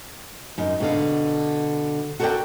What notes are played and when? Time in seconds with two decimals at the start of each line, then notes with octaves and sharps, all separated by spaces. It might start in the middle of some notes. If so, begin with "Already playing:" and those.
0.58 F#2 D#4
0.80 B2 D3 F5
2.20 F#4 A4 A#4 C#5 D5 G5